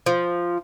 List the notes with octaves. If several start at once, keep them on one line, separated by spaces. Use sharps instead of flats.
F3